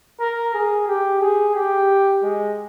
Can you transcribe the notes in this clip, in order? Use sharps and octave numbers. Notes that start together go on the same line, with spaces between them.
A#4
G#4
G4
G#4
G4
G#3